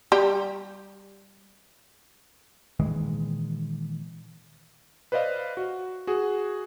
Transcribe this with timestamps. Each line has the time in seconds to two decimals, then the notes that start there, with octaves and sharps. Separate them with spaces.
0.12 G3 G4
2.79 A#2 D#3 E3 G#3
5.12 B4 C5 D5 D#5 F5
5.57 F#4
6.07 F#4 G#4